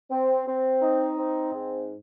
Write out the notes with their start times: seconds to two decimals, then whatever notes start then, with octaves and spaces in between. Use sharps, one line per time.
0.11 C4
0.47 C4
0.82 D#4
1.17 C4
1.53 G#2